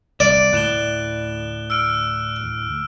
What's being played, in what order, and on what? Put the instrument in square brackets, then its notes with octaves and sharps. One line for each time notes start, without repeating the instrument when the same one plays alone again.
[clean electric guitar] C2 [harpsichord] D5
[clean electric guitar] D2 A2 [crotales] F#6 E7 G7
[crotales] E6 F6 D7